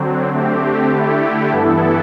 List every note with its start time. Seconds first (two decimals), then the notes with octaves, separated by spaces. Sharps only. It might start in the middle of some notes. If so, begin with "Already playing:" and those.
Already playing: D3 F#3 C4
0.31 D3 A3 C4 G4
0.91 D3 A3 E4 G4
1.52 G2 E3 B3 E4 A4